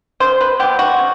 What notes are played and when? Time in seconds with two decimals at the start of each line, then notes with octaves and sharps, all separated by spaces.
0.20 C#3 C5
0.41 B4
0.59 F#3 B3 G4
0.79 F#4
0.98 C#3